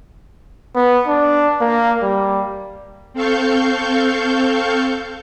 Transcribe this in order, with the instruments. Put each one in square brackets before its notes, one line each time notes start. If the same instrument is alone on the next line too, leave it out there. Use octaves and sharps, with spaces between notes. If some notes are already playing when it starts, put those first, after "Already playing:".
[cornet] B3
D4
A#3
G3
[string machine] C4 A4 F5 C#6 G6